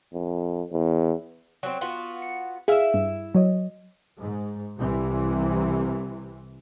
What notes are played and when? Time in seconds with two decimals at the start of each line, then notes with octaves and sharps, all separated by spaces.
0.14 F2
0.72 E2
1.63 F#3 C4
1.81 B3 F4 F#4
2.22 C#7
2.68 E4 G#4 E5 F5
2.94 G2
3.35 F#3 C#5 D#5
4.19 G#2
4.78 C2 C3 E3